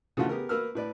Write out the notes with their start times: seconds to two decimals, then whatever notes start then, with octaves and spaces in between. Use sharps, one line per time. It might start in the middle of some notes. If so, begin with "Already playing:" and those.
0.17 C#3 E3 F3 A3 F4 F#4
0.29 B3 G4 G#4 A#4
0.49 A#3 A#4 B4 E6 F6
0.75 A2 B4 D5